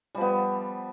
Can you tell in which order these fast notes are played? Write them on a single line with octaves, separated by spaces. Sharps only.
G3 F3 B3